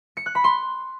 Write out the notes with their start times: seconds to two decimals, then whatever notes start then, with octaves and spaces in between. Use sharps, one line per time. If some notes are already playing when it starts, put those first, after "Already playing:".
0.17 C#7
0.26 F#6
0.35 B5
0.44 C6